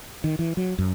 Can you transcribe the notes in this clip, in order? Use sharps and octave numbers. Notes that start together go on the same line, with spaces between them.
D#3
E3
F#3
F#2